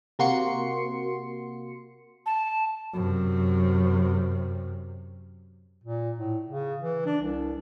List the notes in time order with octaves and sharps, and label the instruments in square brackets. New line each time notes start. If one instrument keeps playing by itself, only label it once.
[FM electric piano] C3 A#3 F#4 C6 C7 C#7
[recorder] A5
[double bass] F#2 C3
[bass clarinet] A#2
A2
C#3
E3
D4
C2